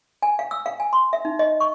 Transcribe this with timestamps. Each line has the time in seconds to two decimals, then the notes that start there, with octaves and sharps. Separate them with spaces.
0.23 G#5
0.39 F5
0.51 E6
0.66 F5
0.80 G#5
0.93 C6
1.13 E5
1.25 D#4
1.39 D#5
1.60 C#6